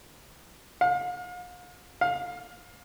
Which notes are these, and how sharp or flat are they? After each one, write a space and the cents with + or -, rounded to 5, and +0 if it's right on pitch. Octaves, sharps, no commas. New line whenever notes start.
F5 +40
F5 +25